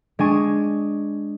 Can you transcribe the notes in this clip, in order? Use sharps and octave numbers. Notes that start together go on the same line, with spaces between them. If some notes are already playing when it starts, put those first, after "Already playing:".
G#3 D4 G#5 C#6